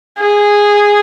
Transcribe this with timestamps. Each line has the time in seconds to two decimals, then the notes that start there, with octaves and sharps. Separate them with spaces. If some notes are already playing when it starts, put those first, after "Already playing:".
0.18 G#4